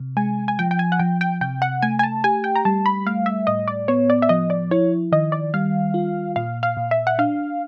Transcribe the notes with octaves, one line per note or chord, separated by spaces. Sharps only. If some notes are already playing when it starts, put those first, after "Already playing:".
Already playing: C3
G#3 G#5
G#5
F3 G5
G5
G#5
F#5
F3 G5
G5
C3 G5
F#5
A3 G#5
G#5
A5
G4 G#5
G5
A#5
G3 A5
B5
A3 F5
E5
A2 D#5
D5
B3 C#5
D5
E5
F3 D#5
D5
E4 C#5
D#3 D#5
D5
G3 F5
F4
A#2 F5
F5
A#2
E5
F#5
D4 F5